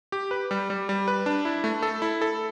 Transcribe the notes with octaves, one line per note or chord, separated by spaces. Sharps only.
G4
B4
G3
G3
G3
B4
D4
E4
A3
A4
E4
A4